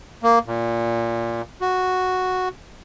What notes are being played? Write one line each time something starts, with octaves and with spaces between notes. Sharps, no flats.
A#3
A#2
F#4